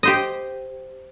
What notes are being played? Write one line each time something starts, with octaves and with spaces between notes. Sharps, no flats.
G4 C5 D#5